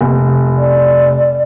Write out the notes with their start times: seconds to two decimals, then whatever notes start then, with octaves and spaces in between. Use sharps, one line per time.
0.01 F1
0.57 D5